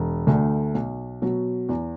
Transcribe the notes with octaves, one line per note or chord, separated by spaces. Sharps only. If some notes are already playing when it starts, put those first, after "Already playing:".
Already playing: E1
D2 D3 A3
B1
B2 F#3
E2